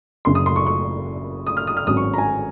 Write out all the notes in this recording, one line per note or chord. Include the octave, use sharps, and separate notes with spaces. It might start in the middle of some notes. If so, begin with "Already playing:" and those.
F#1 F#2 C#3 C6
D#6
C6
C#6
C#6
D#6
F6
D#6
F6
G#1 G#2 F#3 C#4 D#6
C#6
A#5
G#5